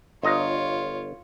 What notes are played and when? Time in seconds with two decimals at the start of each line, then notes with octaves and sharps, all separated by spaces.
0.23 G1 F4 C#5 D#5 A#5